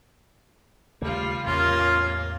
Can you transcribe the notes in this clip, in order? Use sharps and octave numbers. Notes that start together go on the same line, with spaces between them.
D#2 C#3 G3 A3 F4
A1 E2 C3 A#3 C#4 F4